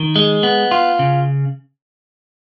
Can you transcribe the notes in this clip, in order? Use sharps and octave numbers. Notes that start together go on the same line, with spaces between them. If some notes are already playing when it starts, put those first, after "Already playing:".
Already playing: D#3
G#3
B3
F4
C#3